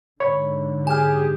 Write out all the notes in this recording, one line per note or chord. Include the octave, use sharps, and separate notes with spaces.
G#2 D3 C#5 B5
G4 G#4 G#5 F6